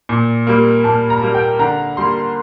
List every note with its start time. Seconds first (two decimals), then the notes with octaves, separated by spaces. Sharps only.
0.09 A#2
0.47 G3 A#3
0.84 A#2 A5
1.10 A#5
1.22 G3 A#3
1.35 G5
1.59 D3 A#5
1.97 G3 A#3 C6